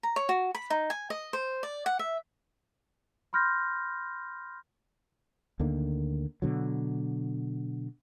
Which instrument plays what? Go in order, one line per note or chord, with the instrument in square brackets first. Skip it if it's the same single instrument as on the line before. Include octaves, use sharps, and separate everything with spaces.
[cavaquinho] A#5
C#5
F#4
B5
D#4
G#5
D#5
C5
D5
F#5
E5
[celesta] B5 C6 F6 G6 A#6
[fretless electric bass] D2 D3 D#3 A#3
B2 D3 F#3